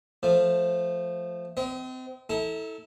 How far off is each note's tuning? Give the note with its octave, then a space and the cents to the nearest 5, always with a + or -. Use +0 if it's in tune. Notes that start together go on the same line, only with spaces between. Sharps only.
F3 +0 A3 +0
C4 -30 D#5 +25
E4 -30 A4 +0 A#5 +0